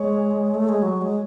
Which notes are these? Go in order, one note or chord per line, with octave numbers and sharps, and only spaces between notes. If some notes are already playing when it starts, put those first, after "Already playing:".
Already playing: G#3 C#5
A3
G#3
F#3
G#3